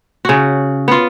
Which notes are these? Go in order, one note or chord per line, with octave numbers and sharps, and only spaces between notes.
C#3 F#4
B3 F4